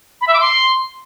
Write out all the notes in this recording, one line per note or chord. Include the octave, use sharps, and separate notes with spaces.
B5
E5
D6
C6